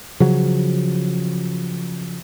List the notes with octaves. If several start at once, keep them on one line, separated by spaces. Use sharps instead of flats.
C#3 F3 F#3